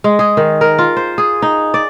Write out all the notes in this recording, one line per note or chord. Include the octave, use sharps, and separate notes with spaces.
G#3
G#4
D#3
A#4
F4
C5
G#4
D#4
D5